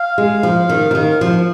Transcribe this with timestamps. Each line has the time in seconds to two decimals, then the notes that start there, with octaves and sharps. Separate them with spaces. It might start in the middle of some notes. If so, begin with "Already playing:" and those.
Already playing: F5
0.18 G#3
0.43 F3
0.69 D#3
0.91 F3
0.95 D#3
1.21 F3